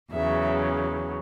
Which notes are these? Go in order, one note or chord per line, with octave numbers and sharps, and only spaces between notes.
E2 C#3 F#3 E5